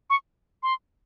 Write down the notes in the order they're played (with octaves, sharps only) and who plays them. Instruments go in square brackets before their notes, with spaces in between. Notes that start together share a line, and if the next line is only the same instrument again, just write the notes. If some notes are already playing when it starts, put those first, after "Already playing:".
[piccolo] C#6
C6